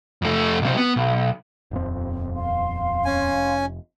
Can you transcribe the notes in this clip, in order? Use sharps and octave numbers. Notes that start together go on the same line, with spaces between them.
F2 A3
B1 C3
B3
B1
D#1 F2 C4
F5 C6
C#4 G#5
F1